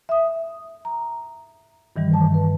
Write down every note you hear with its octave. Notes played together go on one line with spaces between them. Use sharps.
E5 D#6
A#5
G2 D#3 E3 G3
A5
B4